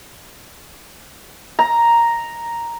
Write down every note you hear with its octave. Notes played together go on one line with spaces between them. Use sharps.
A#5